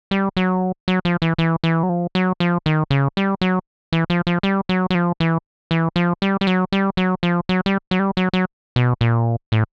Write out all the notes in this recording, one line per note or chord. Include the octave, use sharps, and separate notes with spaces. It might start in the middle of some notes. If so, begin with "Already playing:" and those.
G3
F#3
F#3
F3
E3
E3
E3
F#3
F3
F#3
F3
D#3
C#3
G3
F#3
E3
F3
F3
G3
F#3
F#3
F3
E3
E3
F3
G3
G3
F#3
G3
F#3
F3
F#3
G3
F#3
G3
F#3
F#3
B2
A#2
A2